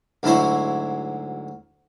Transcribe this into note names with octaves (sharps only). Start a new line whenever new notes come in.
D2 G#2 F#3 E4 C5 C#5